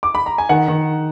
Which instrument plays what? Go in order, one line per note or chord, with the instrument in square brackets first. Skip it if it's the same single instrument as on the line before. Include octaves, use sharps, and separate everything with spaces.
[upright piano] D6
B5
A#5
G#5
D#3 F#5
D#3